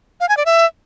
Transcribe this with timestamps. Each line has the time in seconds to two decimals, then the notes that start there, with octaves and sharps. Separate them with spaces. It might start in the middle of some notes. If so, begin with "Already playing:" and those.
0.20 F5
0.29 G#5
0.37 D5
0.46 E5